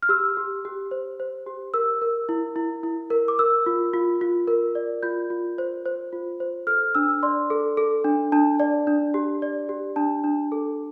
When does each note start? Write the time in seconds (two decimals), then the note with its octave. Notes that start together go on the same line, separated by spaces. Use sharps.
0.02 F6
0.09 G4 E6
0.37 G4
0.65 G4
0.91 C5
1.20 C5
1.47 G4
1.74 A#4 E6
2.02 A#4
2.29 E4
2.56 E4
2.83 E4
3.10 A#4
3.28 D6
3.39 A#4 E6
3.66 F4
3.94 F4
4.21 F4
4.47 A#4
4.75 D5
5.03 F4 G6
5.30 F4
5.58 C5
5.85 C5
6.13 F4
6.40 C5
6.67 A4 F6
6.95 D4 E6
7.23 D5 C6
7.50 A4
7.77 A4
8.04 D4
8.32 D4 A5
8.60 D5
8.87 D4
9.14 G4
9.42 D5
9.69 G4
9.96 D4 A5
10.24 D4
10.52 A4